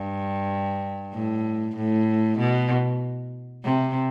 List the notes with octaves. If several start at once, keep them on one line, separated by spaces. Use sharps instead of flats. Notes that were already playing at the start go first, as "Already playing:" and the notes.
Already playing: G2
A2
A2
B2
C3